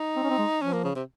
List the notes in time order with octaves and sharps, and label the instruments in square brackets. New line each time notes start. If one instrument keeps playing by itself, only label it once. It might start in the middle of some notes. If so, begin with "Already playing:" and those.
Already playing: [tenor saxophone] D#4
[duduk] C4
C#4
C4
G#3
[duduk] F3 [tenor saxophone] C#4
[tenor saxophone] A#3
C#3
C3